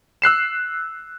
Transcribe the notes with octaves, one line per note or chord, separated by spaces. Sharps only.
E6 F#6 C7 E7